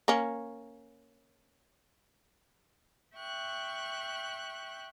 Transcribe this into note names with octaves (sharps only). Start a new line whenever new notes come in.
A#3 C#4
E5 G5 C#6 F#6